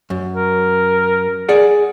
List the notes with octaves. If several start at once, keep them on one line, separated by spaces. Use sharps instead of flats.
F#2
A#4
G#4 D5 F#5